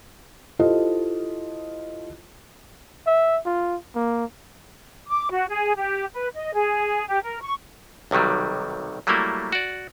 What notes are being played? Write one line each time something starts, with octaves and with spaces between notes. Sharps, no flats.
E4 F4 G4 A4 C5 D#5
E5
F4
A#3
D6
F#4
G#4
G4
B4
D#5
G#4
G4
A#4
C#6
B1 C3 D#3 F#3 G3
F#3 G3 A3 A#3 E4
F#4 D5